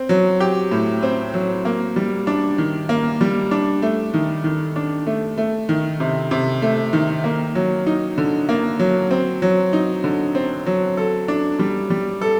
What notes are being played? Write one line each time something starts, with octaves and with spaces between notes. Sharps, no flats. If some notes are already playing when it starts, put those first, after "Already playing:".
Already playing: C4
F#3
G4
A2
C4
F#3
A#3
G3
D4
D#3
A#3
G3
D4
A3
D#3
D#3
D4
A3
A3
D#3
C3
C3
A3
D#3
A#3
F#3
D#4
D3
A#3
F#3
C4
F#3
D#4
D3
C4
F#3
A4
D4
G3
G3
A4